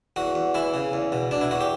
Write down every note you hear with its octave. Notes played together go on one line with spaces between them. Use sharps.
E2 F#4
E2
E3 E4
C#3
E2
B2
B2 D4
E4
E2 F#4
G4